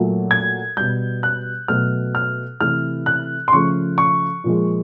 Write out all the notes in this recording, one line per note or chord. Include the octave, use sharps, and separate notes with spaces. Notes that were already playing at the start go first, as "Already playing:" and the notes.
Already playing: A#2 F#3 A3
G#6
B2 G3 G6
F#6
B2 F#3 A3 F6
F6
C3 E3 A3 F6
F#6
C6
C#3 F3 A3 C#6
C#6
A#2 F3 G#3